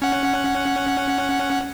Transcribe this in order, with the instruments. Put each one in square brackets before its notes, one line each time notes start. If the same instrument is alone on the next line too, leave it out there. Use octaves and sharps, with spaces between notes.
[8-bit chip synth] C#4 F#5